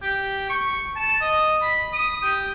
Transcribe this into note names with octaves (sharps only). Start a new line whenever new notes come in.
G4
C#6
A5
D#5
B5
D#6
G4